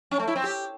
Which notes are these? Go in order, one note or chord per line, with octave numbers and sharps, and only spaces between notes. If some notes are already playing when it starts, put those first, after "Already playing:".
C#4
A3
E4
C4
G4